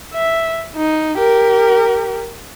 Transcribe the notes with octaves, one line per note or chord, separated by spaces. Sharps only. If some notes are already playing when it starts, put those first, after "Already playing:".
E5
D#4
G4 A#4